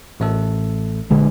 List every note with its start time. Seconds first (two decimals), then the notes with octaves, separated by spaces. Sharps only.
0.20 A1 A3 A4
1.10 A#1 D3 G#3